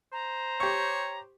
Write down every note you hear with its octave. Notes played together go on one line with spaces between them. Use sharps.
C5 A#5
G4 C#5 C#6